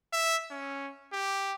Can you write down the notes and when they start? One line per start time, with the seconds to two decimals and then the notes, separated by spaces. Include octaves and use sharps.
0.13 E5
0.51 C#4
1.13 G4